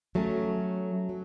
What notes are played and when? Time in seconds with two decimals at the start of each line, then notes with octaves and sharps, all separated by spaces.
0.15 F#3 A3 C#4
1.09 F#3